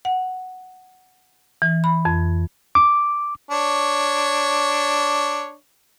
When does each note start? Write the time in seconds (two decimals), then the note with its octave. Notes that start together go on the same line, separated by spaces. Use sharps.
0.05 F#5
1.62 E3
1.84 B5
2.05 F2
2.75 D6
3.51 D4 C#5